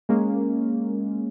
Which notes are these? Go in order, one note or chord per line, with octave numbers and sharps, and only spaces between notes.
G#3 A#3 C#4